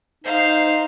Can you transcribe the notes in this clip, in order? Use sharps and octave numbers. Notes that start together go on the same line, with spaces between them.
D#4 C5 F5